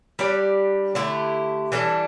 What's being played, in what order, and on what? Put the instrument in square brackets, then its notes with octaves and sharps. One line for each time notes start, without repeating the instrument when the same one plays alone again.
[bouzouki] G3 D4 G4 D5
D3 A3 E4 G4
E3 G3 D4 A4